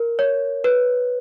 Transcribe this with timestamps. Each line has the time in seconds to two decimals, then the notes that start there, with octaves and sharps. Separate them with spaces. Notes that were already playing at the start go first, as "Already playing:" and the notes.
Already playing: A#4
0.19 C#5
0.64 B4